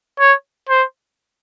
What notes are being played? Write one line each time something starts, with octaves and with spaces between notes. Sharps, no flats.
C#5
C5